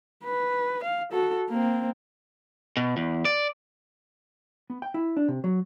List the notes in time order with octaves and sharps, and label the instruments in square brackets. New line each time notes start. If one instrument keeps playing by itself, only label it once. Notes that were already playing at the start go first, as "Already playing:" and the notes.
[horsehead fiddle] B4
F5
F#4 A4
A#3 C4
[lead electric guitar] B2
E2
D5
[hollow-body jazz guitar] B3
G5
E4
D4
C3
F#3